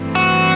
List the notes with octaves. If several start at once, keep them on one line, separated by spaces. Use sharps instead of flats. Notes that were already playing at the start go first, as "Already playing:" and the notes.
Already playing: G2 E3 A3 C4
F#4